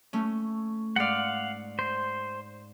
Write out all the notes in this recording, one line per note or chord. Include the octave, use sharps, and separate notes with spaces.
A3 C#4
G#2 D5 F5 F#5
C5